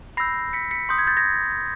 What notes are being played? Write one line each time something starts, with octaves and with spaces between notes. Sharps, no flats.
B5 E6 G6 A#6 C7
B6 C#7
B6 C#7
C6 D#6 G6
G#6
G6 A6
G#6 A#6